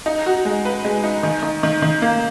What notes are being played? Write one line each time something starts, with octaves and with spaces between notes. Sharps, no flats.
D#4
F#4
G#3
B4
G#3
D#4
D#3
D#3
D#3
D#3
A#3